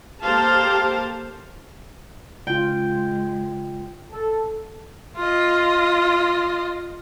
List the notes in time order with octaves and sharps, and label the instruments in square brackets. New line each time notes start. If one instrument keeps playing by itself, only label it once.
[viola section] A#3 G4 A4 C5 F5 A5
[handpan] C#3 F4 [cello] G#3 [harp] G5
[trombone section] A4
[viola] F4 D#5